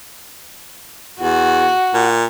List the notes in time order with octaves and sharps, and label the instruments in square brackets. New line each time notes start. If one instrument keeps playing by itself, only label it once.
[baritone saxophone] E2 [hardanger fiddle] F#4
[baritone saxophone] A#2